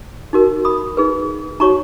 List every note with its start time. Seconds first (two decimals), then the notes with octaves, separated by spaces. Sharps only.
0.33 D#4 F#4 A#4
0.65 B5 D#6
0.97 D#4 G#4 B4
1.60 D#4 F#4 C#5 A#5 C#6